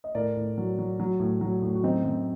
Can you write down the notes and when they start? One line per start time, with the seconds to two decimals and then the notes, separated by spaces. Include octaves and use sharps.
0.04 D#5
0.15 A2 A#4 D5
0.37 A2
0.58 F#3
0.79 F#3
1.00 F#3
1.20 A2
1.41 F#3
1.62 A2
1.75 F#4
1.83 F#2 C4 D#4
2.04 F#2